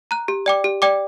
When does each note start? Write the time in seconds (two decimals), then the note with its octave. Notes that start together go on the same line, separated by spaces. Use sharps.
0.11 A#5 F#6
0.28 G4
0.46 D5 G5 D6
0.64 G4
0.82 D5 G5 D6